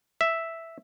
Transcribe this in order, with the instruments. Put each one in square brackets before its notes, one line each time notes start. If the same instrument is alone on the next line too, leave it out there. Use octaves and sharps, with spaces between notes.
[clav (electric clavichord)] E5